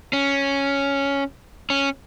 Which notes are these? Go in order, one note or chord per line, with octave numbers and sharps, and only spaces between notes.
C#4
C#4